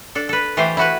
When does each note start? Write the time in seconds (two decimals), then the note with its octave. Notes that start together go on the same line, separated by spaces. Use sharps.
0.15 D4 A4
0.29 A4 B4
0.57 E3 A3 G4 C5 F5
0.77 E4 F#4 B4